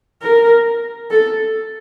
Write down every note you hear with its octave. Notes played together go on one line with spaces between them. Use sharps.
A#4
A4